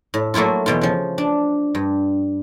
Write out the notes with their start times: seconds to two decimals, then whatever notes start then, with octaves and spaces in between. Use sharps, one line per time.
0.14 A2
0.34 F#3 A3 A#3 E4 F4
0.66 E2 B2 F4
0.81 C#3 F3
1.18 D4
1.75 G2